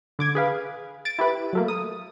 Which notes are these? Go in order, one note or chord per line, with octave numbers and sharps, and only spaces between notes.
D3 D6 G#6
G#4 B4 F5
A6 D7
E4 G4 B4
F#3 A3 A#3
D#6